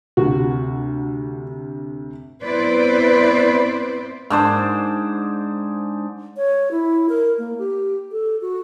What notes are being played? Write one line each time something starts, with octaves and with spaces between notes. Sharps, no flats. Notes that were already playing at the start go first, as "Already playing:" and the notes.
D2 C3 F#4
B3 C4 E4 B4 C5 D5
G#2 D4 C5
C#5
E4
A#4
A#3
G4
A4
F#4